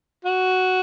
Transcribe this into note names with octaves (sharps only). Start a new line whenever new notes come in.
F#4